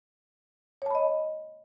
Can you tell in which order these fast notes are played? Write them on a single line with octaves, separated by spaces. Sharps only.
C#5 A5 B5 D#5